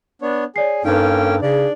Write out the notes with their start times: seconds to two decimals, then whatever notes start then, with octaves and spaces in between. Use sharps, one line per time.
0.22 B3 D4 C#5
0.56 G#4 C#5 D5 C7
0.85 G2 A#3 C#4 D#4 A4 B4 G5
1.42 C#3 D4 G#4 D5